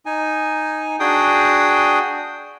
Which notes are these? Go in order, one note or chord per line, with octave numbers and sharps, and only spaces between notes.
D#4 G#5
D4 F#4 G#4 G5 D#6